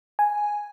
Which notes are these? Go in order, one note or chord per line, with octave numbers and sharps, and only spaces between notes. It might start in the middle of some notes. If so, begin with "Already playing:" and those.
G#5